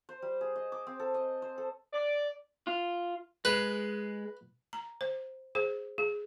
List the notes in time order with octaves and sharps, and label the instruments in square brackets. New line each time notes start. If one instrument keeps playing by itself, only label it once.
[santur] C5
G3
G#4
D#5
D6
C4
A4
D#5
C5
A4
[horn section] D5
[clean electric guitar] F4
[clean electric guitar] G#3 [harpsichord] B4
[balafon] A#5
C5
G#4 C5
G#4